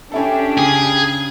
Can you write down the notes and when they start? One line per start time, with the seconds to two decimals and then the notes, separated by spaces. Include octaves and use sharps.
0.12 C#4 D4 E4 G4 A4
0.58 C#3 G#4